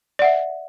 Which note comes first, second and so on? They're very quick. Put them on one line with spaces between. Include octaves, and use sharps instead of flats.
D5 F#5 E5